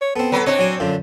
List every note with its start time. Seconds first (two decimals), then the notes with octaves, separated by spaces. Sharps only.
0.01 C#5
0.16 B3 C4 A4
0.32 F#3 A4 B4
0.46 C4 D4 C#5 D#5
0.59 F#3 G#5
0.80 F#2 D3 F4